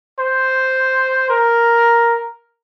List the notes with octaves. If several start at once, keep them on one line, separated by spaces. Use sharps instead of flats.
C5
A#4